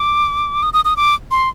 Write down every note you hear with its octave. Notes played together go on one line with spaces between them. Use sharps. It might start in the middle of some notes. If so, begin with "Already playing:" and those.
Already playing: D6
D#6
D#6
D#6
D6
C6